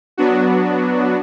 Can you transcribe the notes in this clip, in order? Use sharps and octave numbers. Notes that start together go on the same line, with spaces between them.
F#3 B3 D4 F#4